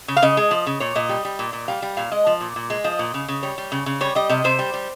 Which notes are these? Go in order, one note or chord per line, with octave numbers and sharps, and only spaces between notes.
C#3
F5
C#3 D#5
G#3
F3
C#3
A#2 C#5
A#2 D#5
G3
G3
A#2
A#2
G3 F5
G3
A#2 F5
G#3 D#5
F3
A#2
A#2
G#3
F3 D#5
A#2
C#3
C#3
G3 C#5
G3
C#3
C#3
G3 C#5
G3 D#5
C3 D#5
C3 C5
G3
G3